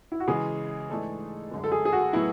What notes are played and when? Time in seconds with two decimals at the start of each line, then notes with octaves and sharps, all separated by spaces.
0.12 E4
0.20 F#4
0.28 C#3 E3 G#3 G#4
0.90 G#2 E3 A3 D4 A4
1.51 F#2 D3 G#3
1.64 A4
1.72 G#4
1.85 G#4
1.93 F#4
2.13 A2 F#3 B3 E4